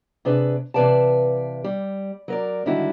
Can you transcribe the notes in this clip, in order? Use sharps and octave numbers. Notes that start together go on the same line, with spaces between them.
C3 D4 G#4 B4
C3 E3 B4 D5 F5 A5
G3
F#3 A#4 D5
G#2 D3 D#3 G3 E4 F#4